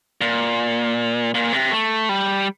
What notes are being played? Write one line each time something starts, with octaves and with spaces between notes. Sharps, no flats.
A#2
A#2
C3
A3
G3